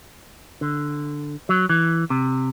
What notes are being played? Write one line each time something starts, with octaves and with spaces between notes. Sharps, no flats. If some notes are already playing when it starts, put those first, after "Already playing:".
D3
F#3
E3
C3